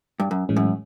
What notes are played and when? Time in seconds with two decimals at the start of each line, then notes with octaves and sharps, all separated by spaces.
0.20 G2
0.31 F#2
0.49 A2 E3 G#3 C#4
0.57 F#2